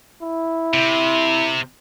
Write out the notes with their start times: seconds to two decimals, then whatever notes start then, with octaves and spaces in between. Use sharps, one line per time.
0.22 E4
0.74 C3